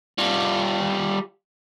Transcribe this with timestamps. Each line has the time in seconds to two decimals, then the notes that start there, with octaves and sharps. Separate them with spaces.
0.18 G3 F4